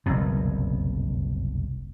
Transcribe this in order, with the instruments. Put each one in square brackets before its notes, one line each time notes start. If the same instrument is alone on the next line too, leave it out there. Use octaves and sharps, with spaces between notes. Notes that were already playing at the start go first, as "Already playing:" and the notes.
[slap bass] F#1 C2 F2 B2